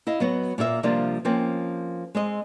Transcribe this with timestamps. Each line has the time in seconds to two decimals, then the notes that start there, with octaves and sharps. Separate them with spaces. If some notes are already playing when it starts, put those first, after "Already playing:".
0.07 E4 D#5 F5
0.20 F#3 B3 F#4
0.58 A#2 A#3 A#4 E5
0.83 C3 F3 G3 A#3 D4 F4
1.25 F3 A#3 C4 C#4
2.15 G#3 C4 D#5